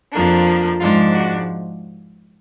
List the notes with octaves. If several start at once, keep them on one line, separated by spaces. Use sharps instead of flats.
F2 F3 A#3 D4
G#2 F3 G#3 D4 F4
F#4